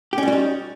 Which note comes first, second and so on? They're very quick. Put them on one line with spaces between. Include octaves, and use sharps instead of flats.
G4 C#4 G3 F#4 D#4